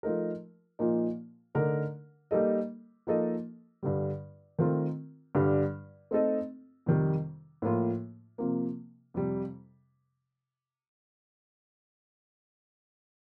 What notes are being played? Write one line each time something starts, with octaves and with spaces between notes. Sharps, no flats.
F3 A3 D#4 A#4
A#2 F3 A#3 D#4
D3 A3 D#4 A#4
G3 A#3 D#4 A4 D#5
F3 A#3 D#4 A4 D#5
G2 D3 G3
D#3 A3 C4 F4 A#4
G2 D3 G3 D4
A3 C4 D#4 A4 D#5
F2 C3 D#3 G3
A2 F3 A#3 F4
C3 F3 A#3
F2 C3 G3